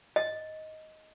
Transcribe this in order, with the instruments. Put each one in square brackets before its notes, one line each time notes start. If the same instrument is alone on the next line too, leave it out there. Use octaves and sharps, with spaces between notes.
[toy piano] D#5